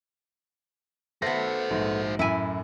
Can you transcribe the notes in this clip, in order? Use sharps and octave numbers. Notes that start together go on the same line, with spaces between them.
A3 B3 F#4 C5 A#6
A#1 G#2
F#2 A2 E4 G#5